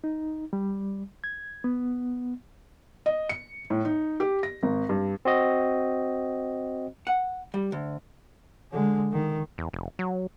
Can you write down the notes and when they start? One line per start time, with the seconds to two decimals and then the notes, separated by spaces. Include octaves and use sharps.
0.04 D#4
0.53 G3
1.24 G#6
1.64 B3
3.06 D#5
3.29 C#7
3.70 A2
3.85 D#4
4.20 G4
4.43 A#6
4.63 G#1
4.89 G2
5.25 C4 F#4 D#5
7.07 F#5
7.54 G3
7.72 D2
8.71 D3 G#3
9.12 D#3
9.58 E2
9.73 F1
9.99 F#3